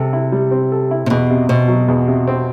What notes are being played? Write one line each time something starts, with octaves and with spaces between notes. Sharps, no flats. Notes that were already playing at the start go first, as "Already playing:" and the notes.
Already playing: C3 G3 C4 A4
E4
G3
C4
A4
E4
C3
E2 B2
C3
B2 C4
F#3
E2
C3
C4